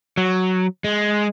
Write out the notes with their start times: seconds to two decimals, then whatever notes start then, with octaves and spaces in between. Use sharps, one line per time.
0.17 F#3
0.84 G#3